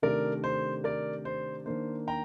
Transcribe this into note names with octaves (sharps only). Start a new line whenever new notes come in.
C3 D#3 A3 D4 A#4 D5
C5
A#4 D5
C5
D#3 A#3 D4 C5
G5 A#5